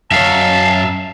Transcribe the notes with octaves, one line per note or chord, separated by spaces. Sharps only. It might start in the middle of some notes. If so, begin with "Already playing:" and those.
F#2 C#5 E5 F5 A5